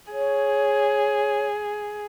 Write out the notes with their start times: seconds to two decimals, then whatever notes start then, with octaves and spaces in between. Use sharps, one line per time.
0.12 G#4 C#5